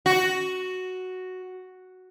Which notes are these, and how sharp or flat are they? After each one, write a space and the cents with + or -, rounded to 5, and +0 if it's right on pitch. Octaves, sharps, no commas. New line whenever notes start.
F#4 +0